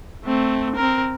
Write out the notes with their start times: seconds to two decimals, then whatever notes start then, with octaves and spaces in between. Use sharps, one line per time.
0.25 A3 C4
0.76 C4 A#4